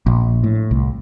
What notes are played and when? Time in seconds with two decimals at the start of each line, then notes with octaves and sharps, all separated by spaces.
0.06 A#1
0.44 A2
0.71 C2